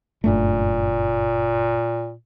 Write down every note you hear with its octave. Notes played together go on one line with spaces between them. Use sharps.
F#1 G2 A#2 A3